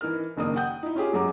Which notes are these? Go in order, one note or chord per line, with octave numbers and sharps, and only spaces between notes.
E3 D#4 A#4 F6
F#1 D#3 A#3 D4 D#6
F#5 G5 D#6 G6
D#4 E4
C#4 F4 G4 G#4
F#2 F#3 G#3 A#5 D6